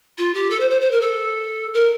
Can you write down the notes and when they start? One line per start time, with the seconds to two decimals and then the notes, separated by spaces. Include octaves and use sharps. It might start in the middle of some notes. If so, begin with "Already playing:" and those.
0.18 F4
0.34 G4
0.50 A4
0.60 C5
0.70 C5
0.81 C5
0.91 A#4
1.01 A4
1.74 A#4